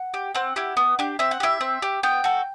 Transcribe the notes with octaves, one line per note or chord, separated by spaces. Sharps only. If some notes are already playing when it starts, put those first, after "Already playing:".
Already playing: F#5
G4
C4 F#5
E4 G4
B3
D4 G4
C4 E5
F#5
E4 G4 E5
C4
G4
B3 G5
F#4 A4